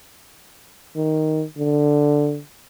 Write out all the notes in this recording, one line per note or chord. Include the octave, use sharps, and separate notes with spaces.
D#3
D3